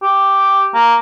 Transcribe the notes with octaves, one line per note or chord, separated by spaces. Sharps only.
G4
A#3